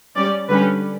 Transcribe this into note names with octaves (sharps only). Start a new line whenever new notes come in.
G3 C#4 D5
D3 G3 C#4 B4